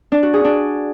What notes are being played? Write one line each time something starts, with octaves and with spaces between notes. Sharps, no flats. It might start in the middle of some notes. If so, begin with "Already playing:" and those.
D4
F#4
G#4
D4